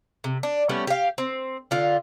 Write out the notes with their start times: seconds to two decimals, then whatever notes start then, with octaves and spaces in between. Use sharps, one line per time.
0.24 C3
0.43 D4
0.69 G3 A3 B3 C#4
0.87 G4 F5
1.18 C4
1.71 D3 F4